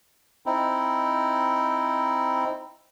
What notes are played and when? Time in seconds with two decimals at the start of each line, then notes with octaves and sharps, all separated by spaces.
0.46 C4 D#4 E4